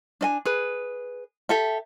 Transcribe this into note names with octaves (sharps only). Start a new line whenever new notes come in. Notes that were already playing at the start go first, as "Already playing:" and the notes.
D4 D#5 G#5
G#4 B4
G4 A4 E5